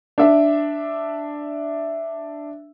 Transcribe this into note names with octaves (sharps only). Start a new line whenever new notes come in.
D4 E5